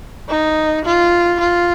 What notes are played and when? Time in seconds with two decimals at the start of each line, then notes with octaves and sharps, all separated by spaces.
0.29 D#4
0.85 F4
1.40 F4